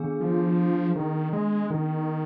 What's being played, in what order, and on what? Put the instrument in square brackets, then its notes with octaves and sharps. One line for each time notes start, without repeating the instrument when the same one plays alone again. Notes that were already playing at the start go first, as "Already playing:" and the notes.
Already playing: [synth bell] D#3 B3 D4 G#4
[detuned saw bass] F3
D#3
G#3
D#3